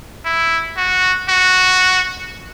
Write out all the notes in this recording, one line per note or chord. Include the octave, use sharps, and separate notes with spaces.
E4
F#4
F#4